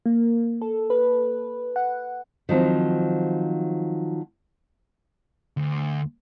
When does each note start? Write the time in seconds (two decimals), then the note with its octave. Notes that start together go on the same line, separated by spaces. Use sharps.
0.06 A#3
0.61 A4
0.90 B4
1.76 F#5
2.49 D#3 F3 F#3 C4
5.57 D2